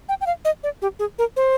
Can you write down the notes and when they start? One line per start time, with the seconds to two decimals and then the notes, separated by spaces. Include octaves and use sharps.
0.09 G5
0.21 G5
0.26 F5
0.45 D#5
0.63 D5
0.82 G4
0.99 G#4
1.18 A#4
1.36 C5